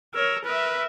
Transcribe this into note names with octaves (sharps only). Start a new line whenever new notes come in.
A#4 C#5 E6
A#4 B4 E5